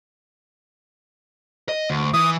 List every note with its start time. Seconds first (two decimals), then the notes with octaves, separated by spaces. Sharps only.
1.69 D#5
1.90 D2
2.14 E3 D#6